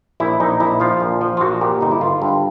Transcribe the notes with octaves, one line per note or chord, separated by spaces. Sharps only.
A#1 E4
A#1 D#4
A#1 E4
F3 F4
A#1
F3
F4
A#1 F#4
A#2 G4
G1 D#4
E4
G1 F4
G2